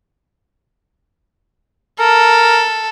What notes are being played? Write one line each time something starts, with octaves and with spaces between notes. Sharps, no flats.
A4 A#4